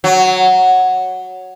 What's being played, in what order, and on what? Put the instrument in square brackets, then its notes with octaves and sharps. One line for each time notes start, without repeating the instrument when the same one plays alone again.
[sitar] F#3